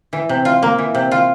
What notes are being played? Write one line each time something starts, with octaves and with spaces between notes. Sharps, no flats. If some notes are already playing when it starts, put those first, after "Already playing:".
E3
C3
F4
A#3
E3
C3
F4